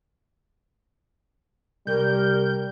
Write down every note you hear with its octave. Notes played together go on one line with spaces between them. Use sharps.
C2 G3 A#4 G6